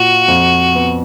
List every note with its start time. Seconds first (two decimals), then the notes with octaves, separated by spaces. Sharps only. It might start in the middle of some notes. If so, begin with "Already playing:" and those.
Already playing: A#2 F4 F#4
0.28 F2
0.75 B3